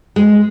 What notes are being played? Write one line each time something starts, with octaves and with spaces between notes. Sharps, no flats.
G#3